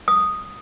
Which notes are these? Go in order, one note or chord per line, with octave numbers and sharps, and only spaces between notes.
D#6